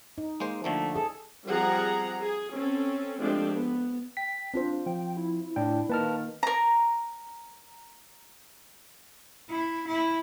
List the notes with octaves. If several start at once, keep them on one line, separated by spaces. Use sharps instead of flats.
D#4
G#3 A#3 C5
D3 F3 A3 A#3
G#4 A4
F3 G3 C4 G#4 F#5 A#5
G#4
C4 C#4 A4
F3 G#3 A3 C4 D4 G4
B3
G5 B6
C4 D4 F4 C5
F3 G5
E4
A2 D4 G5
D#3 A#3 B4 A5 F6
A#4 A#5
E4
E4